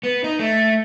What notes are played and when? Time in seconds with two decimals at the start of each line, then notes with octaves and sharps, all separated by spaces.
0.03 B3
0.24 D#4
0.39 A3